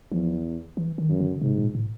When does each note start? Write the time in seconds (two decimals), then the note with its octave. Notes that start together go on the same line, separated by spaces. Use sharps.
0.11 E2 F3
0.77 E3
0.98 D#3
1.10 F#2
1.20 D3
1.41 G#2 C3
1.58 A#2
1.75 A2